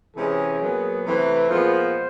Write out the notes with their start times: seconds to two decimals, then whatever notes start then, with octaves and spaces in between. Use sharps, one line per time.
0.16 C3 E3 G#3 C#4 G#4
0.61 A#2 F#3 B3
1.05 C3 E3 A3 C4 B4
1.49 A#2 F3 G#3 B3 C5